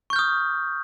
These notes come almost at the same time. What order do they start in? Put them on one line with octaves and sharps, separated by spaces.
C#6 G6 F6 D#6